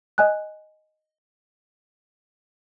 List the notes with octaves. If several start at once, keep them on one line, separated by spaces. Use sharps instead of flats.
D#5 G#5 F#6